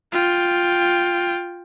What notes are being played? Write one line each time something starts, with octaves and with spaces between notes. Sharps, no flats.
F4 G5